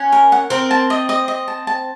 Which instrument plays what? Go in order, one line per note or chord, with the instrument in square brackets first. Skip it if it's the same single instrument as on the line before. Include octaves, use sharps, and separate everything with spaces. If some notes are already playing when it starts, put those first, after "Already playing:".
Already playing: [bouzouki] C#4 [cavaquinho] F#5
[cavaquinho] A#4
F#5
[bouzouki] C4 [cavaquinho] A#4
[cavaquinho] A5
D#5
D#5
D#5
A5
A5